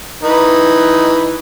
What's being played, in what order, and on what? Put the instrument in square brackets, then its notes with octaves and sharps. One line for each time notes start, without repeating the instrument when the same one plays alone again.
[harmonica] E3 D#4 B4